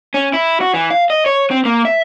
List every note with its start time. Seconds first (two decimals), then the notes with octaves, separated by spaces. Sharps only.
0.14 C#4
0.34 E4
0.61 F#4
0.74 E3
0.91 F5
1.10 D#5
1.26 C#5
1.51 C4
1.65 A#3
1.85 E5